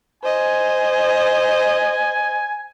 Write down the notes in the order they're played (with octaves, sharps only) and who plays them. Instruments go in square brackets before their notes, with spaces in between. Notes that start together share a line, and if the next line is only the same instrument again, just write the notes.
[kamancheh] C5 D#5 [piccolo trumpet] G#5